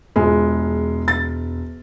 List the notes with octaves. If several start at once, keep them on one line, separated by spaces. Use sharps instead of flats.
E1 G#3 F4
A6